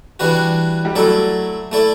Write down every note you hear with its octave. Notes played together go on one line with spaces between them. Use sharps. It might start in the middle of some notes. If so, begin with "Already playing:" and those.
E3 G3 D4 F#4 B4
G3
F#3 A3 E4 A4 D5
A3 E4 A4 D5